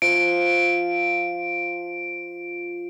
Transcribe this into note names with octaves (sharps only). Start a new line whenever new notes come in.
F3 F5 D7